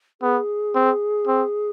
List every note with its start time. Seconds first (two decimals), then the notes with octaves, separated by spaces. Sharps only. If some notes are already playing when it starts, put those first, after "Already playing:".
0.21 B3 G#4
0.75 C4
1.27 C4